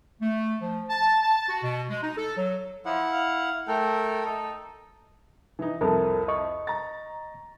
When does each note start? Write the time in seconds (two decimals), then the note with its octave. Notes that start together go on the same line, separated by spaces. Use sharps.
0.21 A3
0.61 F3
0.89 A5
1.23 A5
1.49 F#4
1.63 B2
1.90 G#3
2.02 D#4
2.17 A4
2.37 F#3
2.85 F3 E4 F#5
3.12 F5
3.68 A3 A4 A#4 G5
4.26 D#4 A4
5.59 E3 D#4
5.81 C2 F2 A4 A#4
6.28 D#5 C#6
6.67 A#5 A6